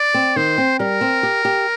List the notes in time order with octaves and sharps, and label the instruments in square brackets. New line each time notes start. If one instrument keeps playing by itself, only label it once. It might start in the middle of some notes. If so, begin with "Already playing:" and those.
Already playing: [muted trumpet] D5
[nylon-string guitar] C4
[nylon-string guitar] D#3 [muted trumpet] C5
[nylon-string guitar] C4
[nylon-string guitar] G3 [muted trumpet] A#4
[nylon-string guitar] C4
G4
G4